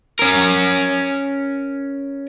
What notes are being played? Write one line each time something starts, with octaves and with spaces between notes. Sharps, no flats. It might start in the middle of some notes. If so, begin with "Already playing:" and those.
C#4 A#4